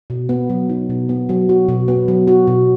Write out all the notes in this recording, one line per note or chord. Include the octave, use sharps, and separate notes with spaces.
B2
B3
F#3
D#4
B2
B3
F#3
F#4
B2
B3
F#3
F#4
B2